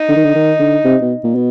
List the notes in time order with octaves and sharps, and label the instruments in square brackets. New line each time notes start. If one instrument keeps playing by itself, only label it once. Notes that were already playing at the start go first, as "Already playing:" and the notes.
Already playing: [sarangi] D#4
[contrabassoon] D3
D#3
D3
D#3
D3
C3
B2
A#2
B2